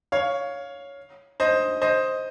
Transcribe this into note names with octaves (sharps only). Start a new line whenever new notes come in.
C#5 F5
C5 D#5
C5 D#5